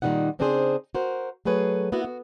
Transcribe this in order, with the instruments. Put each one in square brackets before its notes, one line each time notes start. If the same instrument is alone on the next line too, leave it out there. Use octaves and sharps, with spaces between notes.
[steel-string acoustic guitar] A#2 D#3 E3 G3 D#4 F#5
C#3 C4 D4 D#4 G#4 C5
F#4 A#4 C5
F#3 A3 G#4 B4 C#5
A#3 B3 E4 F#4
F#4